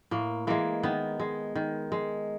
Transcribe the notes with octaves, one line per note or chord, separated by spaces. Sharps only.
A2 A#3
E3 G#3 A#3
D#3 B3
G#3
D#3
G#3